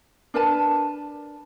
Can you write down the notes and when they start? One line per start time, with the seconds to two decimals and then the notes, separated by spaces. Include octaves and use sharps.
0.34 D4 A#4 B4 A5